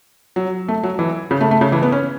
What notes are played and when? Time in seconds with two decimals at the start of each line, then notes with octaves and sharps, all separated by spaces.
0.36 F#3
0.68 A3
0.83 F#3
0.99 E3
1.31 C#3
1.41 A3
1.51 A3
1.61 C#3
1.72 E3
1.83 B3
1.92 C#4